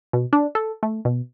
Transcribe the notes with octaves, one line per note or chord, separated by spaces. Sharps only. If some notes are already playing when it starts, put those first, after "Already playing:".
B2
D4
A4
A3
B2